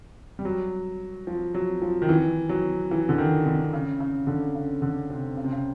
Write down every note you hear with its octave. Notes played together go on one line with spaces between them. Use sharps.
G3
F#3
F3
F#3
F3
D#3
E3
F#3
E3
D3
D#3
D3
C#3
C#3
D3
C#3
D3
C3
C#3
C3
C#3